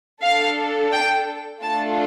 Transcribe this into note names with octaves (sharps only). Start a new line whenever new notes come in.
D4 A4 F5
G5
A3 D4 F4 A4 A5